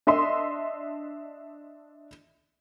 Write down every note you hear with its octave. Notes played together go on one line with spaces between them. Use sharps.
D4 D#5 E5 C6